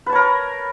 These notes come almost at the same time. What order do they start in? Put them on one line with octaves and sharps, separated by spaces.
B4 A5 C#5 A#4